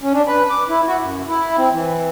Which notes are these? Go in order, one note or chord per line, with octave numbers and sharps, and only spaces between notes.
C#4
D4
B4
D6
E4
F#4
F#2
E4
C4
E3